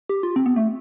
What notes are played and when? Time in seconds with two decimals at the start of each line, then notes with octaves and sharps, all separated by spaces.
0.09 G4
0.23 F4
0.36 C4
0.46 B3
0.56 A3